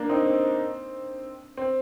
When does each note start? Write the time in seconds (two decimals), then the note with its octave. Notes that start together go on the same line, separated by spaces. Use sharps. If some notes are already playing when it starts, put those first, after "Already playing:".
Already playing: A#3 D4
0.09 C4 D#4
0.26 C4
1.57 C4